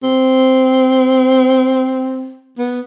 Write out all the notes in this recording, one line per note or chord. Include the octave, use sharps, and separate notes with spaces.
C4
B3